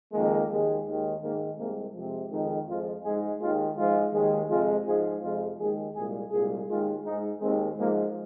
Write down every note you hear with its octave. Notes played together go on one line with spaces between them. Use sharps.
F2 D#3 G#3 A#3
D#2 D#3 G#3
D#2 D#3 G#3
G#2 D#3 G#3 A#3
C2 C3 G#3 A#3
F2 C3 F3 G#3
F2 D#3 G#3 D#4
F2 F3 G#3 F4
G#2 G#3 G#4
D#2 D#3 G#3 F4
G#2 F3 G#3 F4
D#2 D#3 G#3
F2 C3 G#3 F4
G#2 F3 G#3 G#4
F2 C3 G#3 F4
D#2 D#3 G#3 G#4
C2 A#2 G#3 G#4
C2 A#2 G#3 G#4
D#2 D#3 G#3 F4
G#2 G#3 D#4
D#2 D#3 G#3 C4
G#2 F3 G#3 A#3